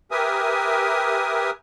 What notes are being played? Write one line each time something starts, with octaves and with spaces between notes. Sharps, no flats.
G4 A#4 B4 E5 G#5 D#6